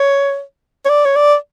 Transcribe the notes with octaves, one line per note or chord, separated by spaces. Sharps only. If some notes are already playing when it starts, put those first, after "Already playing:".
Already playing: C#5
C#5
D5
C#5
D5